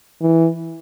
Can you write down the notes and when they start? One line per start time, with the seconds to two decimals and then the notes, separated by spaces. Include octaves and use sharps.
0.21 E3